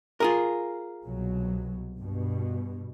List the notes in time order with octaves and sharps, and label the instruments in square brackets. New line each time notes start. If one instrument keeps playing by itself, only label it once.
[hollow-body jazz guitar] F4 G#4 A#4
[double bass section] C2 B2 F#3
G2 B2